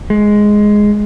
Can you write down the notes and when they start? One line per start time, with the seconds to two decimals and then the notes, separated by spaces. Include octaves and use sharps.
0.10 G#3